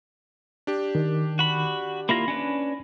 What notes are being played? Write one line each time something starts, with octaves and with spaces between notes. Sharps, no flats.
D4 G4
D#3
F#4 B5
A#3 E4 F4 B5 A#6
C#4 D4 B4